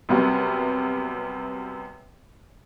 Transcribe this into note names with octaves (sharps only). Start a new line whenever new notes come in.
F#2 C3 F#3 G3 B3